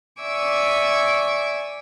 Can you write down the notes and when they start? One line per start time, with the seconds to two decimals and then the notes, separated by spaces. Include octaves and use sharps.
0.21 D5 E5 G#5 C#6 D6 E6